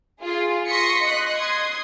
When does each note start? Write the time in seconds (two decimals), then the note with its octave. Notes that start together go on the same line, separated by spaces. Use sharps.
0.20 F4 G#4
0.67 C6 C#6 D#6 A#6 B6 C#7
1.02 D#5 C6 F#6
1.36 C6 D#6 G#6